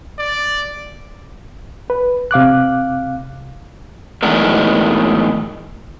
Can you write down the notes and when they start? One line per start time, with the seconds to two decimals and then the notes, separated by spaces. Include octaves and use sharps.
0.19 D5
1.90 B4
2.31 C3 F5 D6 F#6
4.23 E2 A2 D#3 F#3 G#3 B3